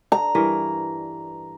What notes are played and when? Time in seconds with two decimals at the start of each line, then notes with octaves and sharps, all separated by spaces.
0.12 A#5
0.35 G2 E3 A#4